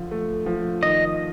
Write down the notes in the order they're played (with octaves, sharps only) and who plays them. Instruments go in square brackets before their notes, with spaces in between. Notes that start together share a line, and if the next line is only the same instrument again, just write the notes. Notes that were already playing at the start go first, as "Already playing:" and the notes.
Already playing: [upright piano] D3 F3
A3
F3
[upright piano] D#3 [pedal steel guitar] D#5